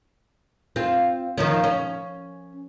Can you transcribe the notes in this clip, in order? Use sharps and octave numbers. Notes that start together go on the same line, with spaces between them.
C4 F4
D#3 F3 C#4
C#4